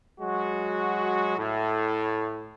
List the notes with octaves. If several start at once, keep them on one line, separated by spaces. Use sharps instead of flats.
F#3 G#3 F#4
A2